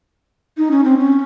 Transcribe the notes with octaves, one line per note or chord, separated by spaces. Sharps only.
D#4
C#4
C4
C#4